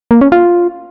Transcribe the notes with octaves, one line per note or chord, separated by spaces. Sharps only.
A#3
C#4
F4